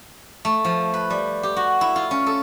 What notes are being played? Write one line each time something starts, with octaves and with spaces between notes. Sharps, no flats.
A3
F3
B4
G3
G4
F#4
E4
F4
C#4
A4